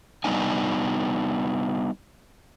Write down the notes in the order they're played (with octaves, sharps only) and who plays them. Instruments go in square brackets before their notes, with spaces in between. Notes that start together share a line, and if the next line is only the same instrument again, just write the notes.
[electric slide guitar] G3 B3 D4 D#4 G#5